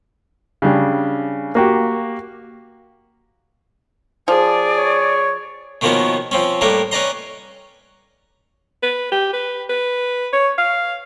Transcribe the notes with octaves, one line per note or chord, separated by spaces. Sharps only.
C#3 G3 D4
A#3 F#4 G4
F3 G#4 D5
C#5
B2 D#3 F3 A#3 B3 C#4
F3 C4 C#4
A2 G3 A#3 A#4 B4
C#4 B4 D5 D#5 A#5 C6
B4
G4
B4
B4
C#5
F5